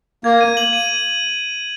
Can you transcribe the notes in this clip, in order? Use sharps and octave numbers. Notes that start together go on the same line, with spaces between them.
A#3 G#6
D#7
F#7
D#7